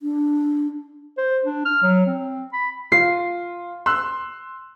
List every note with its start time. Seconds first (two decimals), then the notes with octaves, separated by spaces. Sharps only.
0.02 D4
1.18 C5
1.43 D4
1.65 F6
1.82 F#3
2.06 C4
2.53 B5
2.92 F4 C7
3.86 C6 E6 F#6